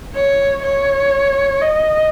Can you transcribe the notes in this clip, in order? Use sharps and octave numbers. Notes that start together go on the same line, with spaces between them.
C#5
C#5
D#5